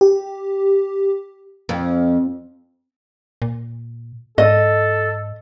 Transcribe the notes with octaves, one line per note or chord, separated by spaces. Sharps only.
G4
F2
A#2
G#2 A4 D#5